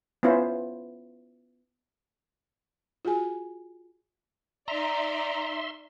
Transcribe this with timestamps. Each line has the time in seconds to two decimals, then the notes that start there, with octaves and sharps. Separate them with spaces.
0.23 B3 C#4 E4 F4 B4 C5
3.05 F4 F#4 G#4 G#5
4.68 D#4 D5 E5 A#5 C6